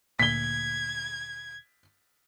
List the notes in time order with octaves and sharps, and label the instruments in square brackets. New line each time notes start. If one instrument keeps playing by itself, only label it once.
[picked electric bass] D2 A#2 [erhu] G#6 [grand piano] B6 G7